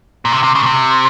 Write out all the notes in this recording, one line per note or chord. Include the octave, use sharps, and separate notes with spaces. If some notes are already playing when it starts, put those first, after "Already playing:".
A#2
C3
C3
C#3
A#2
C3